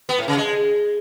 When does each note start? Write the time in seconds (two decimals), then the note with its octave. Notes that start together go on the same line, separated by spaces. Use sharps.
0.09 B3
0.18 A2
0.28 C#3
0.37 G#3